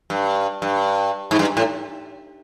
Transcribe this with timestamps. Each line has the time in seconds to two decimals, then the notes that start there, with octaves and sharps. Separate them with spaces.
0.10 G2
0.62 G2
1.31 G#2
1.39 G2
1.57 A2